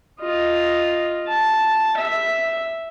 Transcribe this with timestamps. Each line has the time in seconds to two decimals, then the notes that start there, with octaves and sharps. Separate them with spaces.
0.20 F4 D#5
1.28 A5
1.97 E5